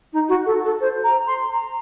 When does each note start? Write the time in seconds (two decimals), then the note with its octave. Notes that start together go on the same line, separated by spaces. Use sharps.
0.12 D#4
0.28 F#4
0.46 A4
0.64 A4
0.80 C5
1.03 A#5
1.27 C6
1.50 A#5